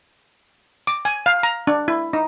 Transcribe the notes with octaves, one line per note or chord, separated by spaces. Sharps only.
D6
G#5
F5
A#5
D4
E4
D#4